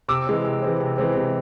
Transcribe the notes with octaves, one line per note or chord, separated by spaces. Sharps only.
C3 D6 E6
E3 G#3 C4
C3
E3 G#3 C4
C3
E3 G#3 C4
C3